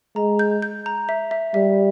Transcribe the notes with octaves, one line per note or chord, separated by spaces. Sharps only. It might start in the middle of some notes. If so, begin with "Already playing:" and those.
G#3 A#5
G6
G6
A#5
E5
E5
G3 E5